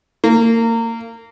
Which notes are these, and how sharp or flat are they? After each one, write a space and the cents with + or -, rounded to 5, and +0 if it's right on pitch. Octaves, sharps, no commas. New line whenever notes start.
A#3 -30